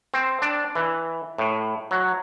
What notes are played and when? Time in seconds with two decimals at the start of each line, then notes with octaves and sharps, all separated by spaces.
0.14 C4
0.42 D4
0.75 E3
1.38 A2
1.91 F#3